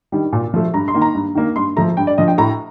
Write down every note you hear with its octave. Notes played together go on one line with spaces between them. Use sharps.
D#3 G3
A#2
F3 A3
G2 A#5
C6
D#3 A#3
A#5
G2
D#3 A#3
G2 C6
F3 A3 A#5
G2 G5
D5
D3 F3 D#5
G5
A2 A#5